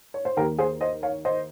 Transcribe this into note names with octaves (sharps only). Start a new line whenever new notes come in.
C#5
C5
D#2 D#3 A#3 G4 A#4
G#4 C5
C5 D#5
C#5 F5
C5 D#5